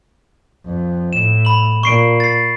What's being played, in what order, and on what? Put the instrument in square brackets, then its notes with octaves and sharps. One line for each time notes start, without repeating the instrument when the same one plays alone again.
[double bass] F2
[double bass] A2 [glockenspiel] E7
[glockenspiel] B5 F#7
[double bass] A#2 [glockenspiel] C#6 C7 D7
[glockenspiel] A6 C7